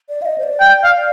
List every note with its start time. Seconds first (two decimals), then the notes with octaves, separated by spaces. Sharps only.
0.09 D5
0.22 F5
0.26 D#5
0.38 C5
0.43 D5
0.60 G5
0.84 F5